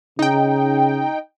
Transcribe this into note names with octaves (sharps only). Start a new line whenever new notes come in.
C#3 D#4 G5